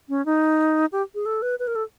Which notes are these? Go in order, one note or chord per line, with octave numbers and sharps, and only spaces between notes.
C#4
D#4
G4
G#4
A4
B4
B4
A#4
A4